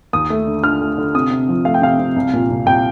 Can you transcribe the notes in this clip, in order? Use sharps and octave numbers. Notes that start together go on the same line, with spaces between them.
D#2 D#6
A3
D3
D3 F6
A3
D3
C3 D#6
C3
F3
A3 F5
G5
C3 F5
C3
C2
A#2
C2
C2 G5